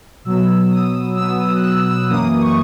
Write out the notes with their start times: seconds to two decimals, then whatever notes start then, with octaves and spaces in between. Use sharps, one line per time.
0.25 B2 F#3 B3 E6
0.71 D#6
1.16 B2 F#3 B3 E6
1.40 D#6
1.55 F#6
1.63 E6
1.87 E6
2.09 F#2 E3 A#3 D#6
2.41 C#6